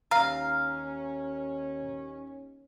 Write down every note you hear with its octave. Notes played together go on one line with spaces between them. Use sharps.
D#2 C#4 F5 A#5